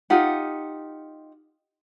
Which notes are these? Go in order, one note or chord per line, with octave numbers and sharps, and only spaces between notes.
D#4 F4 G4 F#5